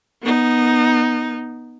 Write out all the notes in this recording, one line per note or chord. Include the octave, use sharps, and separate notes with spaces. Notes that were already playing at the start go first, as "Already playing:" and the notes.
B3 D#4